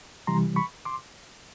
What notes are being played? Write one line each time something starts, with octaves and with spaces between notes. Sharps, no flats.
C3 E3 G3 A#5 C6
B5 C#6
C6 D6